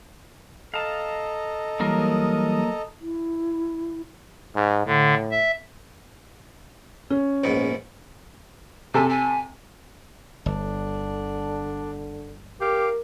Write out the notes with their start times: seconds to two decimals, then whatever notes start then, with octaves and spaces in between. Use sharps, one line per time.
0.74 A4 D#5 F5 A5 A#5
1.80 E3 F#3 G3 A#3 A#4 D#6
3.01 E4
4.55 G#2
4.86 A2 D3
5.31 E5
7.10 C#4
7.44 A#1 G#2 B3
8.94 C3 A4 G#5
9.09 G#5
10.46 G1 D3 D4
12.61 G4 A#4 F5 D6